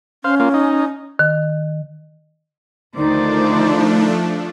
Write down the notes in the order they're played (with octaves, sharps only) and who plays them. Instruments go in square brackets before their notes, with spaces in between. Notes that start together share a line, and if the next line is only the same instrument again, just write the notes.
[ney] C#4 [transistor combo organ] C5 F5
[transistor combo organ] A#3 F4
D#4
[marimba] D#3
[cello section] D2 D#3 [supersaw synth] F3 A3 D4 [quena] D#4 [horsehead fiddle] C5 D5